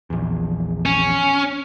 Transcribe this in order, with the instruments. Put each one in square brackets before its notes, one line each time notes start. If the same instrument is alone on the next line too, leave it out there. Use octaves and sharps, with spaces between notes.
[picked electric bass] A#1 E2
[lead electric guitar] C#4